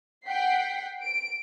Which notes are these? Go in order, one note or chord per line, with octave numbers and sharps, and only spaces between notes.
F#5 G5 B6 C7
D7